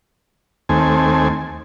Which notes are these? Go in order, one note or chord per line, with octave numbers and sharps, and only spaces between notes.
D#2 A3 C4 G#5